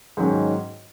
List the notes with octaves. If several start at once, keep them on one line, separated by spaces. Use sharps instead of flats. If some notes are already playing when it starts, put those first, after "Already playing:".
G#2 D#3 F#3 C#4